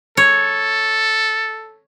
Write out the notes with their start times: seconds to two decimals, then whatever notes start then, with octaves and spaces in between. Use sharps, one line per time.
0.17 A4 C#5